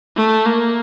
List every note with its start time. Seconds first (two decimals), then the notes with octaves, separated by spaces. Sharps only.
0.17 A3
0.46 A#3